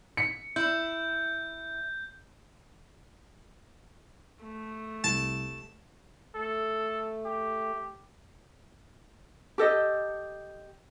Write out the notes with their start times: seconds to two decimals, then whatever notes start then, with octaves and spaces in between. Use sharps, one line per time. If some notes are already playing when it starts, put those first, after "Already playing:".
0.17 B6 C#7
0.56 E4 G6
4.43 A3
5.04 C2 A5
6.35 A3 A4
7.26 G4
9.58 G4 A4 D#5